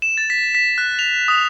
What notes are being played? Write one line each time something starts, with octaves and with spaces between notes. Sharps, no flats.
E7
A6
B6
B6
F#6
F7
D#6